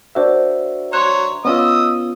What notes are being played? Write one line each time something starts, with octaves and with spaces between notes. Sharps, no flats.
D4 F#4 A#4 C5 C#5 E5
C#5 A#5 C6 F#6 E7
B3 C#4 F4 D#5 D#6 E6